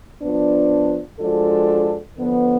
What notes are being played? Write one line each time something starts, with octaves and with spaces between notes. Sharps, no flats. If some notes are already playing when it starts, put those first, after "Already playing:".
F3 B3 D4
F3 G#3 D4 F#4 A4
D3 F3 B3